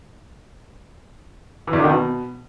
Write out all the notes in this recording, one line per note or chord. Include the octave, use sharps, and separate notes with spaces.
E3
E2
D3
D#3
B2